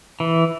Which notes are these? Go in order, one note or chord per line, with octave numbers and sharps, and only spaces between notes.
E3